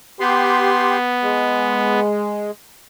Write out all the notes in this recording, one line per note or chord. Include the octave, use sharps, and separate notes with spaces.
B3 G4 C6
G#3